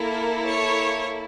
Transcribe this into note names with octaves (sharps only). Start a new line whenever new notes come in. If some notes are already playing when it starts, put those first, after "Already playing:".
Already playing: A#3 E4 A4 A#4
C#5